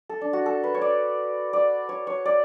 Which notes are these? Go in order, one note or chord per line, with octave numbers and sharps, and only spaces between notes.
A4
D4
F#4
A4
B4
C#5
D5
D5
C#5
C#5
D5